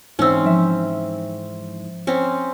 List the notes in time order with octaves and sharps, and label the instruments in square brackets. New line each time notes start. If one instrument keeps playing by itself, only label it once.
[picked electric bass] G#2 E3 [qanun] C4 C#4 [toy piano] D#4 E6
[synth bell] F3 E5
[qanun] C4 C#4